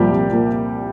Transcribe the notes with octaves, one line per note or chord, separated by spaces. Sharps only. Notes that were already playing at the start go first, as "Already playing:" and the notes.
Already playing: C2 A#2 F3 G3 A#3 G4
C2
A#2 F3 A#3